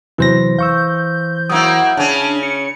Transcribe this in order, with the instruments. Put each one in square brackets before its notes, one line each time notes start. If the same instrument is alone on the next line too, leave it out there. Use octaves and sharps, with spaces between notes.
[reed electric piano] E2 C3 F#3 [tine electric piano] E3 C5 A#6
[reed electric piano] F5 C#6 E6 [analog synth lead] G6
[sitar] F#3 A#3 E4 [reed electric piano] D#6
[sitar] C#3 C#4 [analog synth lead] D4
[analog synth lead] C#7